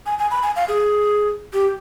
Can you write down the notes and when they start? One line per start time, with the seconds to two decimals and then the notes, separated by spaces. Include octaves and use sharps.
0.06 G#5
0.19 G#5
0.31 B5
0.43 G#5
0.56 F5
0.68 G#4
1.53 G4